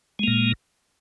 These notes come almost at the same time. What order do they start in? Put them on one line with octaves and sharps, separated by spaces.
G#3 A#3 A#2